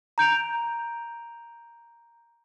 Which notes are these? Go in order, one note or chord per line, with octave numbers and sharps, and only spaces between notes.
A#5 G6 D7 F7